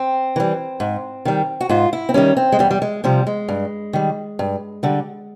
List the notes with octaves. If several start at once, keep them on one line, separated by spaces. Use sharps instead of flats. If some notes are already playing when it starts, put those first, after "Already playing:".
Already playing: C4
E3 G3
G#2
D#3 G3
F#4
G#2 F4
E4
C4
D#3 G3 C#4
C4
G#3
E2 G3
G3
G#3
C3 F3 G3
G#3
G2
D#3 G3
G2
D3 G3